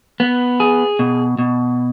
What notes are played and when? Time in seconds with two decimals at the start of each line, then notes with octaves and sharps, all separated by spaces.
0.20 B3
0.60 G#4
0.99 B2
1.39 B2